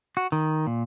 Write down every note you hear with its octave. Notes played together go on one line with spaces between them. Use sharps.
F#4
D#3
A#2